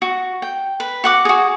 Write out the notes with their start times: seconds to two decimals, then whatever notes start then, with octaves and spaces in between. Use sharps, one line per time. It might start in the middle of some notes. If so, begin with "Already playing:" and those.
0.02 F#4
0.42 G5
0.80 B4
1.04 F#4 F#5 D6
1.25 F#4 G#4